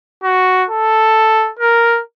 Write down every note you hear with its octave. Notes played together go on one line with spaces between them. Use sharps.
F#4
A4
A#4